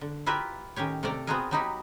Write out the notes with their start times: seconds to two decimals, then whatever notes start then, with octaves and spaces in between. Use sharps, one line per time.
0.01 D3
0.26 E4 F4 G4 A#4 B4 E5
0.76 A2 D#3 C#4 G4 C#5
1.03 C3 A3 A4 A#4 D5 A#5
1.27 B3 C4 F4 F#4 G#4 A#4
1.51 F#3 B3 D#4 E4 F#4 G4